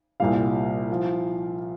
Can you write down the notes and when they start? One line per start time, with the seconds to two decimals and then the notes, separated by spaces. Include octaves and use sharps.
0.20 C2 A#2 G3 F5
0.92 F3